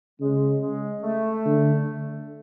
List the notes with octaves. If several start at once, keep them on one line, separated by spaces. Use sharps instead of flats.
C#3 G#3
G#3
A3
D3